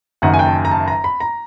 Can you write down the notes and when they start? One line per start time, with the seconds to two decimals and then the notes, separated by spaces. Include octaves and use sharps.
0.22 F#1 F#2 D#3 F#5
0.34 G#5
0.39 G5
0.47 A5
0.55 G#5
0.65 A#5
0.71 A5
0.88 A#5
1.04 B5
1.20 A#5